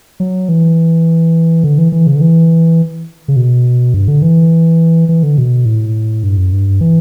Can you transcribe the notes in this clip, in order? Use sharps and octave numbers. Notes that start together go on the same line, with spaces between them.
F#3
E3
D3
E3
E3
C#3
D3
E3
C#3
B2
G2
D3
E3
E3
D3
B2
A2
G2
F#2
G2
E3